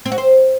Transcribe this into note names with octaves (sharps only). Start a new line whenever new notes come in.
C4
F#4
C5